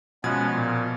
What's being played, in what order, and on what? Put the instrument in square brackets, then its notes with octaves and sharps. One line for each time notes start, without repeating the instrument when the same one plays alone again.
[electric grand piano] B2 F3 G#6 [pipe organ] G#3 B3 C#4
[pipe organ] A#2